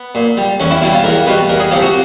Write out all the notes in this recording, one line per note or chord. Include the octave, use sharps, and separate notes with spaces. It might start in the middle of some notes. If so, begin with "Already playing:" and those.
Already playing: B3
A#2
G3
E2 C#4
E4
B2 G3 E4
F4
E2 A#4
B2 G3 B4
E2 A#4
G#4
C3 F3 G4
F#4